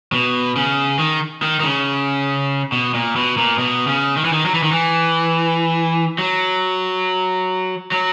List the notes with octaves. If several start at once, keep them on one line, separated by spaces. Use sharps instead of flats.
B2
C#3
D#3
D#3
D#3
C#3
B2
A#2
B2
A#2
B2
C#3
D#3
E3
D#3
F#3
E3
D#3
E3
F#3
F#3